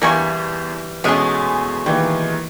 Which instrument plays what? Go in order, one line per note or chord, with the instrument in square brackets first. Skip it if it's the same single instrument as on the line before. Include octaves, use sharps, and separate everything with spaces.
[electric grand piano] E2 [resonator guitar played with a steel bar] E3 G3 [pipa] A#3 G#5 C#6
[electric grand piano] E2 G#5 [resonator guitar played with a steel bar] B2 G#3 [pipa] A3 C#4
[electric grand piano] D#3 E3 A#3 [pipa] G3